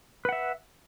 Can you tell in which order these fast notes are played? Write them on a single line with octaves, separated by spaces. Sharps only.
B4 F#5 E5